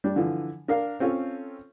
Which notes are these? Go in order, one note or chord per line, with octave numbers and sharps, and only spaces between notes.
G3 D4
D3 E3 F3
D4 A#4 F5
C4 C#4 F4 A4